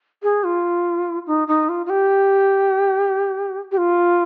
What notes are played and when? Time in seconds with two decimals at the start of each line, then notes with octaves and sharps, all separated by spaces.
0.23 G#4
0.44 F4
1.27 D#4
1.48 D#4
1.69 F4
1.86 F4
1.90 G4
3.72 G4
3.78 F4